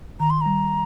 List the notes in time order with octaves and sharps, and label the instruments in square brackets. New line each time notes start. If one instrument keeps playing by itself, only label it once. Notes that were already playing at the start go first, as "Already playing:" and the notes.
[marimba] D#3 [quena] A#5
[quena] C6
[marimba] G3 [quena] A#5